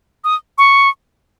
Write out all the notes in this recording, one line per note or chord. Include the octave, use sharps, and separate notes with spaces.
D#6
C#6